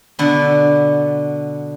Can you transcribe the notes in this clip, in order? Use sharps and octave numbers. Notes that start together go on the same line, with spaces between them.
B2 D3 B3